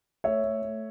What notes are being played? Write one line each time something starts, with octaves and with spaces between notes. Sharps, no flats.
A3 C#5 E5
A3
A3